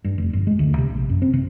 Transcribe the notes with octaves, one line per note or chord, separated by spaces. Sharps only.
G2
F1
G1
G#3
D2
C3
A#1
F#2
C4
C3